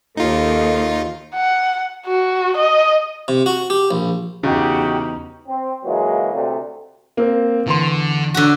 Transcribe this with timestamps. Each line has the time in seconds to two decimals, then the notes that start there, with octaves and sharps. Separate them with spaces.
0.17 D#2 D#4 F4 A4
1.35 F#5
2.06 F#4
2.57 D#5
3.28 C3
3.46 F#4
3.70 G4
3.91 A#1
4.43 E2 C#3 D#4 F#4 G4
5.47 C4
5.85 C#2 E3 F#3 G#3 A#3
6.33 D2 C3
7.17 A#3 C4
7.67 E2 D3 C6
8.34 D3 F#4